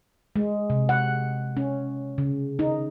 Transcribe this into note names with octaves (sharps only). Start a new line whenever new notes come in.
G#3
C3
F#5
C#4
C#3
D#4